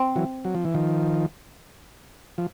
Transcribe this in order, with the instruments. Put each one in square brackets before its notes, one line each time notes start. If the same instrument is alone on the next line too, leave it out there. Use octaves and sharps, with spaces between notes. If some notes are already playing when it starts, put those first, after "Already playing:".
Already playing: [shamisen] C4
[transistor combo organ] E3 F#3
F#3
F3
E3
D#3 F3
F3